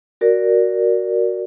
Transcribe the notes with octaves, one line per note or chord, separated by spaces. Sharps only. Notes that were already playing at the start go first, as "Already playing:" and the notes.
F#4 A#4 D5